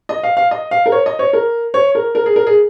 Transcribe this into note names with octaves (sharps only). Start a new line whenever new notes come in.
D#5
F5
F5
D#5
F5
A#4
C#5
D#5
C#5
A#4
C#5
A#4
A#4
G#4
A#4
G#4